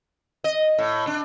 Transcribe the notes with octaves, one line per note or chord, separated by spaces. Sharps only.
D#5
A2
D4